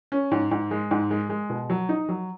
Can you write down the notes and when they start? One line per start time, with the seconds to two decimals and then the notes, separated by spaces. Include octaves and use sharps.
0.12 C#4
0.31 G#2
0.51 G#2
0.71 G#3
0.91 G#2
1.11 G#3
1.29 G#3
1.50 B2
1.70 F#3
1.89 D#4
2.09 F#3